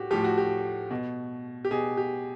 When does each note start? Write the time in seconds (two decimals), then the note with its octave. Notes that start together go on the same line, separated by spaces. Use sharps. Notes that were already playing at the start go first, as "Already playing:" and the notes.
Already playing: A2 F#4 G4
0.10 A2 F3 G4
0.24 F#4
0.38 G4
0.91 B2
1.65 G4
1.71 B2 G#4
1.97 G4